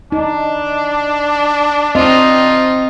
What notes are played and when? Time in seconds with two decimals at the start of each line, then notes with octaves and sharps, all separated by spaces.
0.12 D4 D#4
1.95 C4 D#4 F4 D#5